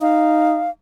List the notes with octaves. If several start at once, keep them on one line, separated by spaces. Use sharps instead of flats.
D#4 F5